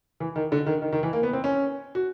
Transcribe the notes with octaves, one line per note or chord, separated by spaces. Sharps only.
E3
D#3
D3
D#3
D#3
D#3
E3
A#3
B3
C4
C#4
F#4